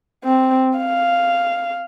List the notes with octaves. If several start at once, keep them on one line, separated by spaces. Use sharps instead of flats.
C4
F5